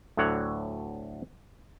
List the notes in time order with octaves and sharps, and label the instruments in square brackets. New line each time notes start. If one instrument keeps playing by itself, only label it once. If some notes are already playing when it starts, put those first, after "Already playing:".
[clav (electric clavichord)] D2 A2 D3 F#3 C#5 F#5